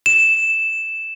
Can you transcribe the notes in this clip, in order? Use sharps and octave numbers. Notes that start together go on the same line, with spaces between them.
E7